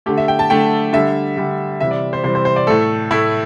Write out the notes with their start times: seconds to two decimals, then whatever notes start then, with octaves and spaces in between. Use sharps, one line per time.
0.06 D3 A3 G4
0.17 E5
0.28 G5
0.39 A5
0.50 D3 A3 G5
0.93 D3 G3 E5
1.37 D3 G3
1.80 C3 E3 G3 E5
1.91 D5
2.13 C5
2.24 C3 E3 G3 C5
2.35 C5
2.45 C5
2.56 D5
2.67 A2 A3 A4
3.11 A2 A3 E4